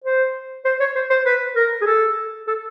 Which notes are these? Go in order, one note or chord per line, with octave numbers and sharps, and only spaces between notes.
C5
C5
C#5
C5
C5
B4
A#4
G#4
A4
A4